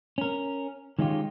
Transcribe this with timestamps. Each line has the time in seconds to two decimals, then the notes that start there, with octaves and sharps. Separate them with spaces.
0.18 C#4 A#4
0.99 D#3 G#3 C#4 D#4 F4 G4